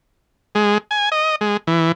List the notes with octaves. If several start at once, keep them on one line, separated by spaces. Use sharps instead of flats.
G#3
G#5
D#5
G#3
E3